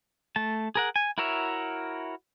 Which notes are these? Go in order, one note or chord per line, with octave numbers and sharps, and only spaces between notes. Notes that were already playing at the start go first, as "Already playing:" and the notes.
A3 A5
G#4 A#4 F#5
G#5
E4 F#4 A#4 C#5 E5